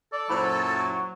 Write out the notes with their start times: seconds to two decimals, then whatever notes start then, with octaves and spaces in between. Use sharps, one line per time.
0.13 A4 D5
0.29 F#2 A#2 F#3 E4 C5 C#5 B5